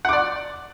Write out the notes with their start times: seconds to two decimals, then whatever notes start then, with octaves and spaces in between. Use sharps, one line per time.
0.05 F#5
0.09 D6
0.13 D5